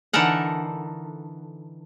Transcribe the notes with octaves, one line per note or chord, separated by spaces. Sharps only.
D3 E3 D#4 A4 A#4 F#5